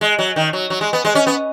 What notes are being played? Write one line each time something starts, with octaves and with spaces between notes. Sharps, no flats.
G#3
F#3
D#3
F#3
F#3
G#3
B3
G#3
C#4
B3